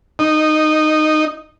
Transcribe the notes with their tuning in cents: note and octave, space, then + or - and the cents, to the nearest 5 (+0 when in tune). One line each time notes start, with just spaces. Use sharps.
D#4 -10